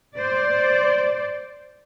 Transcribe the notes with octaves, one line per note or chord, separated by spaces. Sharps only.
C5 D5